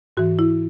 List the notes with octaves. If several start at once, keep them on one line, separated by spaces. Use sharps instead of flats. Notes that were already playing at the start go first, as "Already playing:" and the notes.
G#2 E3 F#4
E4